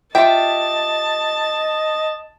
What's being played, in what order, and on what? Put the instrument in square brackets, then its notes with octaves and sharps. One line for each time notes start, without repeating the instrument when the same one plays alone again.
[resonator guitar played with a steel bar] F4 G4 E5 [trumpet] D#5 [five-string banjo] G5 [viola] A5